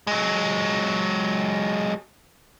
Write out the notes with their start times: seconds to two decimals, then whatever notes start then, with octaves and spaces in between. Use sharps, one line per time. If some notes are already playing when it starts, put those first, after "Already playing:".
0.07 F#3 G#3